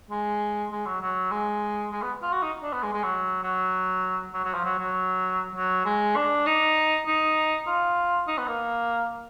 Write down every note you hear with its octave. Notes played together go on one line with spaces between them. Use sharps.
G#3
G#3
F#3
F#3
G#3
G#3
B3
F4
F#4
D#4
D4
B3
G#3
G#3
F#3
F#3
F#3
F#3
F3
F#3
F#3
F#3
G#3
D4
D#4
D#4
F4
D#4
B3
A#3